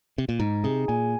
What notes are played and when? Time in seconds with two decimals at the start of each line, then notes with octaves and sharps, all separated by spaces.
0.18 C3
0.29 A#2
0.39 G#2 D#4
0.64 C3 G#4
0.88 A#2 G#5